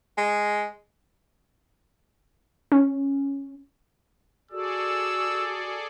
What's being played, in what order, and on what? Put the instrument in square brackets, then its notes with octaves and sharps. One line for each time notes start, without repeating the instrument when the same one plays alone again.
[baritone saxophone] G#3
[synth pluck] C#4
[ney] F#4 [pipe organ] G#4 A4 D5 [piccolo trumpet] E6